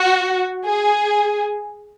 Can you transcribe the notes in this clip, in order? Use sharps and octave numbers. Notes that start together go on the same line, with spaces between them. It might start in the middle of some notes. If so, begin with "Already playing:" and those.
Already playing: F#4
G#4